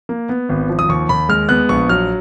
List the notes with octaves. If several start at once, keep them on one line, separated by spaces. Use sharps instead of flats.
A#3
B3
G#1
F3
D#6
D#2 C#6
D#2 B5
G#3 F6
B3 F#6
A#1 C#6
F#3 F6